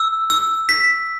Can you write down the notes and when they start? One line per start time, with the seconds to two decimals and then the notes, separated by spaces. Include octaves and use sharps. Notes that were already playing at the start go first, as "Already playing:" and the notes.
Already playing: E6
0.30 E6
0.69 B6